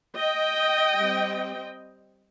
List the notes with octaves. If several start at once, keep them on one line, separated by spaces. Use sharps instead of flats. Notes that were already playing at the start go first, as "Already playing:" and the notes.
D#5 G5
G3 C4